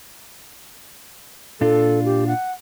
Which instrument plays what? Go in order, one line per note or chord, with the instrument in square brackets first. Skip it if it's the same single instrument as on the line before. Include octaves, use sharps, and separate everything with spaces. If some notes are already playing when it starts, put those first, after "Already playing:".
[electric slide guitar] A#2 D4 F4 [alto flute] A4
[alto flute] G4
F#5